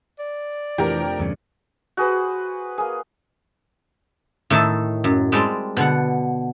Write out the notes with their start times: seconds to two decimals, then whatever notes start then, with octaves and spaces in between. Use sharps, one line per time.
0.19 D5
0.78 F1 F2 E3 D4 G4 A#4
1.19 E2 G2 C#3
1.97 F#4 G#4 B4 C5
2.78 A#3 G#4
4.50 A2 D#3 D#4 E5 A5
5.04 F#2
5.32 G3 G#3 C4 G5 A5
5.77 B2 D3 F#5